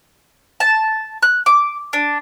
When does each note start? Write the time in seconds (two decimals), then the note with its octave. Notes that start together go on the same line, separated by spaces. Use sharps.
0.60 A5
1.23 F#6
1.46 D6
1.93 D4